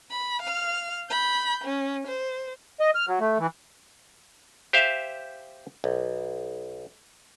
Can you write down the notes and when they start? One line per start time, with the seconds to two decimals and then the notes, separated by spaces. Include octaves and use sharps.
0.11 B5
0.42 F5 F6
1.10 B5 G6
1.65 C#4
2.08 C5
2.80 D#5
2.95 F6
3.07 F#3
3.20 A3
3.39 E3
4.73 G4 C5 E5 F5
5.84 B1